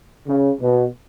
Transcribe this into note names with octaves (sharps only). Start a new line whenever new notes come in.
C#3
B2